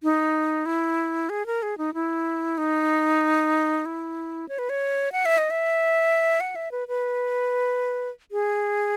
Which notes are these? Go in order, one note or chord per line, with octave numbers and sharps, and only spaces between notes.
D#4
E4
G#4
A#4
G#4
D#4
E4
D#4
E4
C#5
B4
C#5
F#5
E5
D#5
E5
F#5
E5
B4
B4
G#4